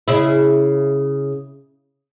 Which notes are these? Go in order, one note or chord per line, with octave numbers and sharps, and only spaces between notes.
C#3 E4